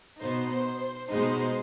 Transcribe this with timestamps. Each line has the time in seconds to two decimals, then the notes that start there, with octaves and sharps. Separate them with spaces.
0.19 B2 B3 D#4 C5
0.50 C5
0.80 C5
1.09 B2 G#3 B3 D#4 C5